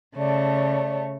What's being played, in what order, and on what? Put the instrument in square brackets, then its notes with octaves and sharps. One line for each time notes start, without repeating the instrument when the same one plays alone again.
[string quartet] C#3 A3 C#5 [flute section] D5 A5